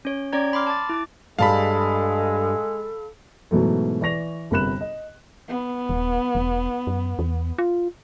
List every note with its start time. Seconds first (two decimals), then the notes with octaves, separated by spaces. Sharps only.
0.05 C#4 C#5
0.33 C#4 C#5 D5 G5 A#5 G#6
0.53 B5 C6 D6 F6
0.67 A5 D6 A6
0.89 E4 D6
1.39 G2 G3 G#3 A4 F5 A5 B5
3.51 G#2 B2 E3 F#3 A3
4.01 E3 D5 C#6 A#6 F7
4.51 G1 C3 A#4 B5 F#6 E7
4.81 D#5
5.48 B3
5.89 D#1
6.35 E1
6.87 F#2
7.19 E2
7.58 F4